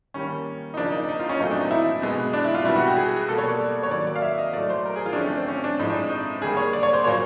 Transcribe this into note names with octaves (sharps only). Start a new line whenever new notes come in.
D#3 G3 A#3 C#4
D#4
C#3 F3 A#3 D4
D#4
D#4
F4
C#4
A#2 F#3 A3 C4 D#4
D4
D#4
E4
B2 G#3 B3
D4
E4
F4
B2 G3 B3 E4
F#4
G4
G#4
B2 G3 A#3 A4
C#5
D5
C#5
D#3 F#3 A#3 D5
D5
F5
E5
D#5
A2 F#3 A3 D5
C5
A#4
G#4
F4
D4
D3 F3 A3 C4 C#4
D4
C4
C#4
D4
A2 F3 G#3 C4 D#4
D4
D#4
D3 G3 A#3 G#4
C#5
D5
C#5
C5
A#2 F#3 A#3 C#5